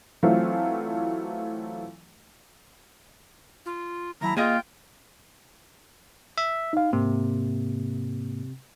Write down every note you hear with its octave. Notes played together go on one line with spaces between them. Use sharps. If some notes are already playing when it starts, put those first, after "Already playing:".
E3 F#3 A3 C4 F4
F4
D#2 F#3 E4 A5 A#5
A#2 A#3 F4 G#4 D#5 G5
E5
D#4 F5
G#2 C3 A#3